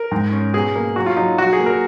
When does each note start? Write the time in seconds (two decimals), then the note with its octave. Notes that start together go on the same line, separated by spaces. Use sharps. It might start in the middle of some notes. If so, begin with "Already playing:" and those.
Already playing: A#4
0.11 G#2
0.32 C#4
0.53 B2 G#4
0.75 A#3
0.96 F#3 F#4
1.06 F4
1.17 F#3 D#4
1.38 F#3 F#4
1.53 G#4
1.59 A#3
1.66 A#4